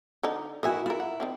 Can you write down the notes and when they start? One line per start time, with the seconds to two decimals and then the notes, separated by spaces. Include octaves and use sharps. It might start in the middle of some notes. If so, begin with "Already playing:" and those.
0.23 D3 D4 D#4
0.63 E4 F#4 A#4 D#5 E5 G#5
0.86 E4 F4 A#4
1.00 F#5
1.20 D#3 C4 D4